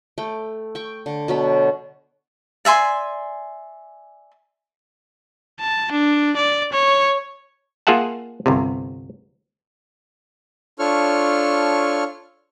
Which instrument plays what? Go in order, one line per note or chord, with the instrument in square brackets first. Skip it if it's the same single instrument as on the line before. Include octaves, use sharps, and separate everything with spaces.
[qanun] A3 G5
G5 C#6
D3
B2 F#3 B5
[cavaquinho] D5 E5 G#5 C6
[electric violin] A5
D4
D5
C#5
[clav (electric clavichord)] A#3 F4 G#4 E5 F#5 A5
G1 C2 C3
[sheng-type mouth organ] D4 F4 A4 C#5 C#6 F6